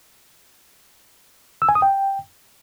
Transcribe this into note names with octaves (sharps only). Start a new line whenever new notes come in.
E6
G#5
D#6
G5